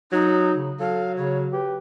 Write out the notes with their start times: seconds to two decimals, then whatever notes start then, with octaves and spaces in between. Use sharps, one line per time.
0.12 F#3 D#4
0.54 C#3
0.80 F#3 A4 F5
1.16 C#3 C#5
1.52 G4 B4